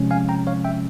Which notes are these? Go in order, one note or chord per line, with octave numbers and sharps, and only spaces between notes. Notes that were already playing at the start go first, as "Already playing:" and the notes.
Already playing: C3 F3 G#3 C#4
F5 G#5
G5 A#5
C#5 F5
E5 G5